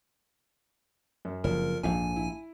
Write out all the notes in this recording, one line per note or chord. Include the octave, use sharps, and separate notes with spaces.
F#2
F#1 F2 A#4
A#1 F2 G#2 G#5
E4